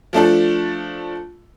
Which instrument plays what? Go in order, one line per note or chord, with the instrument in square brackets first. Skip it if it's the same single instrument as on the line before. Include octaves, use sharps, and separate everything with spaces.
[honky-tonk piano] F3 A3 D4 A4